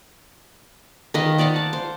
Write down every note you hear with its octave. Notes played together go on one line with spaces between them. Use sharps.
D#3 B4 D#5 F5
C5 D5 F5 F#5
A5
C5